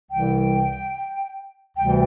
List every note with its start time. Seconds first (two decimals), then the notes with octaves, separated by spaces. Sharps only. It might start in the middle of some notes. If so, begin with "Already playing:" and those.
0.11 C2 C3 E3 G3 G5
1.77 D2 C3 E3 G3 G5